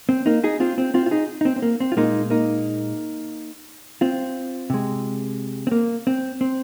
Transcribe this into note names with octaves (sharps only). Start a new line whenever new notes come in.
C4
A#3 D#4
D#4 G#4
C4 F4
C4
C4 F4
F4
D#4 G#4
D#4
C4
C4
A#3
C4
F4
A#2 G#3 A#3 D#4
A#3 D#4
C4 F4
C3 G#3
C4
A#3
C4
C4